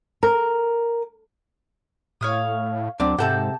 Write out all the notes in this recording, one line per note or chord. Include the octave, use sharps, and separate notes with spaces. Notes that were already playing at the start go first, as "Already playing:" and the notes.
A#4
A2 C#5 F5 D#6
D2 F#3 C4 D4 D6
G#2 C3 A4 F#5 A5 G6